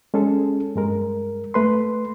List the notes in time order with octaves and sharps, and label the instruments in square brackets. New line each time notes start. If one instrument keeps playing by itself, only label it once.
[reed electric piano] G#3 C#4 G#4 A4
G2 G#3 A#4
A3 B4 C6